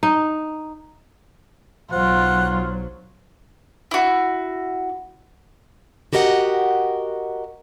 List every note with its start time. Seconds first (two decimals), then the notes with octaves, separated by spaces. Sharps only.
0.03 D#4
1.92 B1 F#3 F4 C5 F#5
3.91 E4 F#4
6.13 F#4 G4 A#4 D#5 F5 F#5